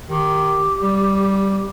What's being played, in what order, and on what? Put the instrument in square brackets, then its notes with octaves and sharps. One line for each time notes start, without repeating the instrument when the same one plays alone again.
[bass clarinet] D#3 [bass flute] G4
[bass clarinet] G3